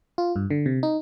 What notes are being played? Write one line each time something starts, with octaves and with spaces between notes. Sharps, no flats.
F4
G2
D3
C3
D#4